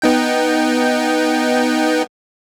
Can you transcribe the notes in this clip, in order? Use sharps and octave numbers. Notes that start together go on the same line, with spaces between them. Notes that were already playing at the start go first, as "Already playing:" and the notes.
B3 D#4 G5